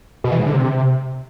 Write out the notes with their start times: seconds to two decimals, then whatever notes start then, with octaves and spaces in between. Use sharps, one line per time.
0.24 B2
0.32 E3
0.39 G#2
0.46 D3
0.54 C3